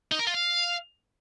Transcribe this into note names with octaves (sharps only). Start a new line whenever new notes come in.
D#4
A#4
F4
F5